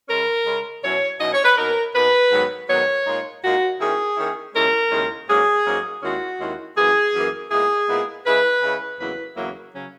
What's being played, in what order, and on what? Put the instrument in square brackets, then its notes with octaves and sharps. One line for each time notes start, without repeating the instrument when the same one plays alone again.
[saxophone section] C#3 G#3 C#4 A#4
C#3 G#3 C#4
B2 F#3 C#4 E4 C#5
B2 F#3 C#4 E4 D#5
C#5
B4
B2 A#3 D#4 A#4
B2 A#3 D#4 B4
G#2 D#3 F#3 B3
G#2 D#3 F#3 B3 C#5
A#2 G#3 D#4
A#2 G#3 D#4 F#4
D#3 A#3 C#4 E4 G#4
D#3 A#3 C#4 E4
D#2 C#3 G#3 C#4 E4 A#4
D#2 C#3 G#3 C#4 E4
G#2 F#3 A#3 C#4 G#4
G#2 F#3 A#3 C#4
D#2 D#3 G#3 C#4 E4 F#4
D#2 D#3 G#3 C#4 E4
F#2 E3 A#3 G#4
F#2 E3 A#3
A#2 G#3 B3 E4 G#4
A#2 G#3 B3 E4
C#3 G#3 C#4 E4 B4
C#3 G#3 C#4 E4
E2 C#3 F#3 A#3 E4 B4
E2 C#3 F#3 A#3 E4
C#3 F#3 C#4